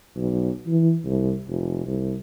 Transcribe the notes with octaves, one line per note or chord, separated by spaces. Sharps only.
B1
E3
C2
F1
C2